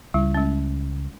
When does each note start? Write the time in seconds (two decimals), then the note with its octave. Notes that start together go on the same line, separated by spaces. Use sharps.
0.14 C#2 G3 E4
0.34 G#3 C#4